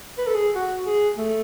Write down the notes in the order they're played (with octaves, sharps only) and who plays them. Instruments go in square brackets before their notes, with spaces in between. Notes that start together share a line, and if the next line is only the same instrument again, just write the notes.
[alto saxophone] B4
A4
G#4
F#4
G#4
A3